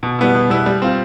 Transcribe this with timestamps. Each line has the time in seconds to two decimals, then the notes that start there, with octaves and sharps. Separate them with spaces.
0.03 B2
0.19 G3 B3 E4
0.35 B2
0.50 G3 B3 E4
0.66 G3
0.82 C4 F4